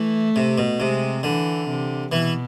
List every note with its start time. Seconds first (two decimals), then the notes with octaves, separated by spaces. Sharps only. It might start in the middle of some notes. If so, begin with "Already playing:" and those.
Already playing: E3 A3
0.36 C3
0.58 B2
0.79 C3 G#3
1.23 D3 E3
1.68 C3
2.12 B2 E3